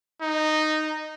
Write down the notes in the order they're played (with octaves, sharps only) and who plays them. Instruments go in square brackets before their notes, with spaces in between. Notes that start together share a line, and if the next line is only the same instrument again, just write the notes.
[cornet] D#4